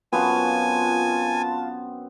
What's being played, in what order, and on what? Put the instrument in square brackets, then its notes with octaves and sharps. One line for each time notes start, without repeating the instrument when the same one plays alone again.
[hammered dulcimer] F#2 B3 C4 [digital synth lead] F4 [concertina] G#5 [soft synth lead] A5